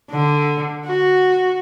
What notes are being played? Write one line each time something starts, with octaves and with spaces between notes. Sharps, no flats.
D3
F#4